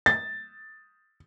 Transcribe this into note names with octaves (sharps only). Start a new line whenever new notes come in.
A6